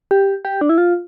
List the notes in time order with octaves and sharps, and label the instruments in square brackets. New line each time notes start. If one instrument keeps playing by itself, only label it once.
[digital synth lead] G4
G4
D4
E4
F4